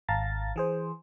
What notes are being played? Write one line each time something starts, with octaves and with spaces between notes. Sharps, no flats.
G#1 F5 A5 A#5 A6
E3 G#4 C5